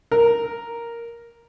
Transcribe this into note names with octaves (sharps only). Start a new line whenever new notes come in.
A#4